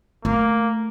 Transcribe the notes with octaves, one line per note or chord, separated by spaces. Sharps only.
A3 A#3